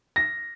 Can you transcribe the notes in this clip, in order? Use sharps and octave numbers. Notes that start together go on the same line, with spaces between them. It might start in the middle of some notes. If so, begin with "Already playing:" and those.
A#6